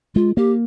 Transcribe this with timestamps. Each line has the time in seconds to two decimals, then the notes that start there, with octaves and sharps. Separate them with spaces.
0.15 G#3 F4
0.37 A#3 G4